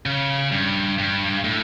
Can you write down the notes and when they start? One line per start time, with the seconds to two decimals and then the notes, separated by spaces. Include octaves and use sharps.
0.06 C#3
0.52 G2
0.98 G2
1.44 A2